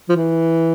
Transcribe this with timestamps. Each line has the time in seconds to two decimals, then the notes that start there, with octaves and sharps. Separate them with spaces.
0.09 F3
0.16 E3